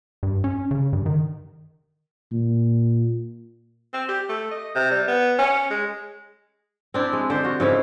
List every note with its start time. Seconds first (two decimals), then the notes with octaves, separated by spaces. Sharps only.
0.23 G2
0.44 C#4
0.71 C#3
0.93 G2
1.06 D#3
2.32 A#2
3.94 C4
4.09 G4
4.29 A3
4.51 D#5
4.75 C3
4.91 G3
5.08 B3
5.39 C#4
5.70 G#3
6.94 C4 D4 E4
7.13 G#3
7.30 D3 G4 C5
7.43 F4 F#4
7.60 G#2 C#3 E4 F5